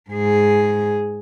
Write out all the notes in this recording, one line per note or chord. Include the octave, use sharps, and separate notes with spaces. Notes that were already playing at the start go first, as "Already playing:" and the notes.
G#2 G#4